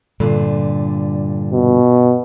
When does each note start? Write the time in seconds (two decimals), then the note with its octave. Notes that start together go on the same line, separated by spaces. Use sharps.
0.20 G2 A#2 D3
1.52 B2